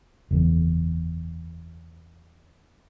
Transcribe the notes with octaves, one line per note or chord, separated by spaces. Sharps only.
F#1 E2